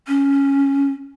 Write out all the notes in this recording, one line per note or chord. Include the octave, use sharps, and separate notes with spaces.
C#4